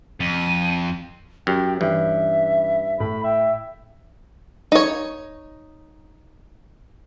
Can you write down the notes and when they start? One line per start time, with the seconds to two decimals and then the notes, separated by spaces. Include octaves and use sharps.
0.20 F2 D#7
1.47 F#2 G4 G5
1.81 G2 E3 C#4 E5
3.00 A2 B5
3.24 E5 G5
4.72 D#4 C#5